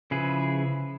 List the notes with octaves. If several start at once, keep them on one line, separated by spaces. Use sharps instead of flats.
C#3 F3 E4 G#4 B4